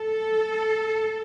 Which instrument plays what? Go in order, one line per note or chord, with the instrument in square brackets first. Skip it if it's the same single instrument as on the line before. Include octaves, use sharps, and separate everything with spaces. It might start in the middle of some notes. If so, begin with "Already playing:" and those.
Already playing: [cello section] A4